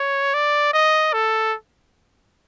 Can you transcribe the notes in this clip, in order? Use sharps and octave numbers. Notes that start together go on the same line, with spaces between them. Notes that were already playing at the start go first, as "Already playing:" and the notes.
Already playing: C#5
D5
D#5
A4